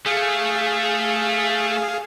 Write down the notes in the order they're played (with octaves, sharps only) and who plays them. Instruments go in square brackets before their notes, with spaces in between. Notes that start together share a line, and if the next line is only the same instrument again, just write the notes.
[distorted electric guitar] A3 [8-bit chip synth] G#4 F5